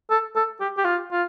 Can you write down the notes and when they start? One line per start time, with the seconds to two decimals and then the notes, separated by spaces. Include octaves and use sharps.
0.11 A4
0.36 A4
0.60 G4
0.78 G4
0.85 F4
1.12 F4